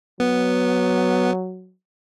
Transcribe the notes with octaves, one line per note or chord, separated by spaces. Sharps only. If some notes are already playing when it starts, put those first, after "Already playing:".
F#3 B3